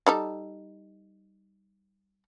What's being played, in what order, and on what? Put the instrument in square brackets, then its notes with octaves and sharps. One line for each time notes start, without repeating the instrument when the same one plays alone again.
[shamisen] G3 D#4 A4